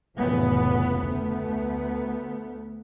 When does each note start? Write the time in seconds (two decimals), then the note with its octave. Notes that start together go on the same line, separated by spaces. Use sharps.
0.17 F1 A2 C#3 E3 B3
0.97 D2 A3 B3